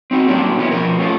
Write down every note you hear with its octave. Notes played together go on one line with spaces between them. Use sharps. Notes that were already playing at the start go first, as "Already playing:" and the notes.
C4 D#4 F#4
A2 F#3 G3 A#3 C#4 D4
C3 E3 B3 C#4 E4 F#4
B2 F3 A#4
A3 C#4 F4 A4